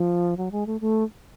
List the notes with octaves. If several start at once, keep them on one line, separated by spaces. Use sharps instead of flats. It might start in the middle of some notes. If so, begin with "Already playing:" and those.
Already playing: F3
F#3
G#3
A3
A3